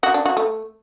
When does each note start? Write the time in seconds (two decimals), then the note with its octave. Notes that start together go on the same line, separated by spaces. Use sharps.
0.03 F#4
0.14 D4
0.25 F#4
0.37 A3